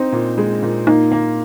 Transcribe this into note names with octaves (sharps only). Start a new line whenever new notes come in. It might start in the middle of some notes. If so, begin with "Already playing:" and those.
Already playing: C4 D#4
A#2
G#3
A#2
A#3 D#4
A#3